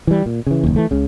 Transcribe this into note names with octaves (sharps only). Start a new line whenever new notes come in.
E3 G3
A#2
C#3 E3
F#1 D#2
E3 A3
C#2 C#3